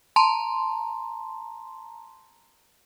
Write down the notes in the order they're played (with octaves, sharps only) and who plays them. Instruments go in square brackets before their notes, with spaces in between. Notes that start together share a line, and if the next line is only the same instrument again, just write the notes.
[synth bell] A5 A#5 C6